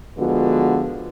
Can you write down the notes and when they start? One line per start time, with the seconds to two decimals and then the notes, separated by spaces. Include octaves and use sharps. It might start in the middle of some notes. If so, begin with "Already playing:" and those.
0.18 D3 F3 G#3 B3 F4 F#4